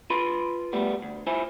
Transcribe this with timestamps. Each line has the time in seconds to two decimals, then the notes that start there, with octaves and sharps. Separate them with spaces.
0.10 F4 B4 B5 C6
0.73 G3 A3 B3
1.02 D2
1.27 E4 F4 C5 G#5